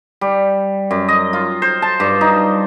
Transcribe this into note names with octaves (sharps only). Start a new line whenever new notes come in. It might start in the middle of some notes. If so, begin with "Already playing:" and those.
G3
F#2
D#5
F4
C5
A5
G2
D#4